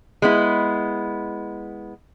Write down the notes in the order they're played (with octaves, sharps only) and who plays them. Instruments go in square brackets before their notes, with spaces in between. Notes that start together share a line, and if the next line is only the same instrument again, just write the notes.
[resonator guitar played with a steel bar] G#3 B3 E4